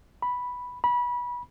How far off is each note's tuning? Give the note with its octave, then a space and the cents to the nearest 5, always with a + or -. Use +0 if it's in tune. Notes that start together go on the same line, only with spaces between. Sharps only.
B5 -5
B5 -25